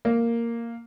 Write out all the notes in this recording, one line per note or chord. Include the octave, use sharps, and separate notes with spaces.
A#3